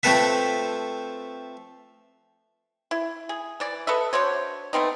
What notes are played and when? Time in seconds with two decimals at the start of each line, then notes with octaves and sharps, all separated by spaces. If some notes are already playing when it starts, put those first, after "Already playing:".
0.03 F3 A3 C4 A4 B4 E5
2.91 E4
3.29 G#4
3.60 E3 D5
3.87 A4 B4 D#5 E5
4.13 D4 F#4 C5 C#5
4.73 A3 B3 C4 D#4